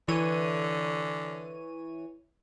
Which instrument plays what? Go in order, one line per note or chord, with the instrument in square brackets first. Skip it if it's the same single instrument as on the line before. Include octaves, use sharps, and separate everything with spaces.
[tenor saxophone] D3 [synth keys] E3 C#5 D#7